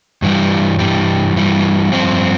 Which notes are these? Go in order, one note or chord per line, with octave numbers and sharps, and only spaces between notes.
G2 E3 G3
G2 E3 G3
G2 E3 G3
G2 F3 C4